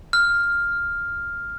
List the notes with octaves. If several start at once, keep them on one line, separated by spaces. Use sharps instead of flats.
F6